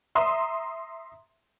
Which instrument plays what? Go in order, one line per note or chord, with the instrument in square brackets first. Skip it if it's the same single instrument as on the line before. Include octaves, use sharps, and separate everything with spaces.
[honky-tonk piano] E5 A#5 C6 D#6